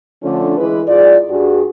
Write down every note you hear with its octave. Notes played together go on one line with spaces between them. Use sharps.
D3 F3 A3 C#4 D4
E3 G#3 E4 B4
G#2 F4 G#4 D5
G2 F#4 G#4